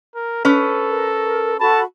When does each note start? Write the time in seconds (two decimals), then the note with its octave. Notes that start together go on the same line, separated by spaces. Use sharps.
0.15 A#4
0.45 C#4 A4 B4
0.89 A#4
1.60 F#4 A4 A5 B5